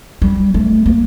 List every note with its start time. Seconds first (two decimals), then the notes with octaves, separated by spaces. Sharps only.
0.22 G3
0.54 A3
0.86 A#3